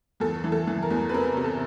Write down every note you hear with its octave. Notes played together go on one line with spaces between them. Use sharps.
E2 A4
E3
A4
E3
A#4
E2
B4
C3 A#4
C3
A4